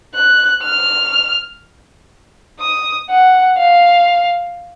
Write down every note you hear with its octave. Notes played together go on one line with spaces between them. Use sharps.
F#6
F6
D#6
F#5
F5